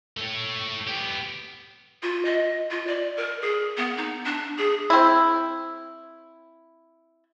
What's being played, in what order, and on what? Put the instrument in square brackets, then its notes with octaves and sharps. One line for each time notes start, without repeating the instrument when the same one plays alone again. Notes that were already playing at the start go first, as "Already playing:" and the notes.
[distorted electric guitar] A3 C#5
B3 G4
[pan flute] F4
D#5
F4
D5
A#4
G#4
B3
D#4
D4
G#4
[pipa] C4 E4